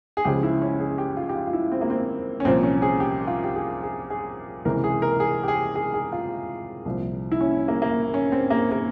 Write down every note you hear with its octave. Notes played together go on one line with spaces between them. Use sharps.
G#4
C#2 C#3 F3 G4
E4
C#4
G#4
G4
F4
G4
F4
F4
E4
C4
A#3
C4
C#4
C2 A#2 F3 C4
C#4
G#4
G4
F4
G4
G#4
G#4
G#4
C#2 C3 E3 A#4
G#4
A#4
G#4
G4
G#4
G#4
G#4
F4
C2 A#2 F3
E4
C#4
A#3
A#3
C#4
C4
A#3
A#3